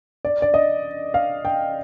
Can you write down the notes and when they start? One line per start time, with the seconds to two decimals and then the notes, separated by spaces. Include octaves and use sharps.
0.25 D5
0.42 D5
0.54 D#5
1.14 F5
1.45 G5